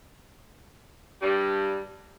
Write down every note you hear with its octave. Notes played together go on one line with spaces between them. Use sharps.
G2 G3